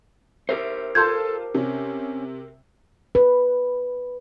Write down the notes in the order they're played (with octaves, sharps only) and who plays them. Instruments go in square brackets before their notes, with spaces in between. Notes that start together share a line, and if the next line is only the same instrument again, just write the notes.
[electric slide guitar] G4 A#4 C5 [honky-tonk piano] E5
[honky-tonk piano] F4 A5 [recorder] A4 [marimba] C6 G6 G#6
[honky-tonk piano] C3 [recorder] C#4
[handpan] B4